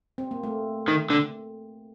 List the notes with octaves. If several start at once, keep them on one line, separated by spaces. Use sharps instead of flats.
C4
A#3
A3
D#3
D3